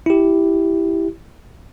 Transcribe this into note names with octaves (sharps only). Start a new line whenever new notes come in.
E4 G4